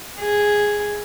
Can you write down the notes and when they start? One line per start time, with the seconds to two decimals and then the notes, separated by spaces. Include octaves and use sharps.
0.20 G#4